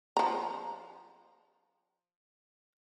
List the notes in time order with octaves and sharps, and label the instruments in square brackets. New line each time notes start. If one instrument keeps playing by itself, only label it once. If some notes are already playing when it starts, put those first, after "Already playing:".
[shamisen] F3 A#5